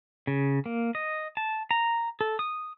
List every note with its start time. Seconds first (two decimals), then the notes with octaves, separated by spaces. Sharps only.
0.27 C#3
0.66 A#3
0.95 D#5
1.37 A5
1.71 A#5
2.21 A4
2.39 D#6